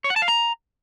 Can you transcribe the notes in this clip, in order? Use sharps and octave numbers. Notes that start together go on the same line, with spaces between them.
C#5
F#5
A5
F5
A#5